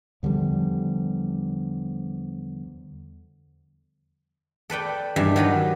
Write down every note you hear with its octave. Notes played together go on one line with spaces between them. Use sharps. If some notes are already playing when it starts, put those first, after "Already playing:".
E2 D3 F3 G3
A4 B4 D5 G5
G2 D#3 E3 E5
D#3 F#3 B4 B5